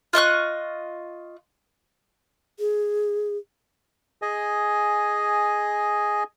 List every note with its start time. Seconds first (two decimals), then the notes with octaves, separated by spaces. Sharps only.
0.13 F4 D#5 C#6 F#6
2.59 G#4
4.22 G#4 D#5 G#5